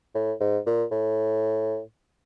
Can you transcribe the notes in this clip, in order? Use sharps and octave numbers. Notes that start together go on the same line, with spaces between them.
A2
G#2
A#2
A2